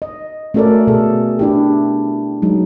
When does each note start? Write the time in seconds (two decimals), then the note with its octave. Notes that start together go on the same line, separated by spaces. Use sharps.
0.02 D#5
0.54 A3 C#4 F#4 A4 A#4 D5
0.87 B2 G#4 A4
1.39 D4 E4 G4
2.42 F#3 G#3 D#4